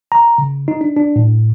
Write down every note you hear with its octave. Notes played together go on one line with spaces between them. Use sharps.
A#5
C#3
D#4
D4
D4
A2